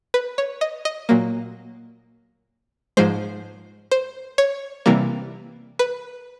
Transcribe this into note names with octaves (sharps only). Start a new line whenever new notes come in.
B4
C#5
D#5
D#5
A#2 F#3 A#3
G#2 F3 G#3 C5
C5
C#5
C3 E3 G3 A#3
B4